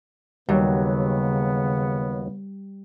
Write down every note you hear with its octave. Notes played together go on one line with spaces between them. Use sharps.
D#2 C#3 F#3 G3 B3